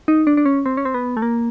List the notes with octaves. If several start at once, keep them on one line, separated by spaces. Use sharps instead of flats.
D#4
D4
D4
C#4
C4
C#4
C4
B3
A3
A#3